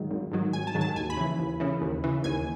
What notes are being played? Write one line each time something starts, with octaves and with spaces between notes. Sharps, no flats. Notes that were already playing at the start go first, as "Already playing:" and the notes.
Already playing: G#2 D#3 F#3
G#1
G#2 D#3 F#3
G#1 G#5
A5
G#2 D#3 F#3
A5
D#2 G#5
B5
C#3 E3
D#2
C#3 E3
D#2
C#3 E3
D#2 G#5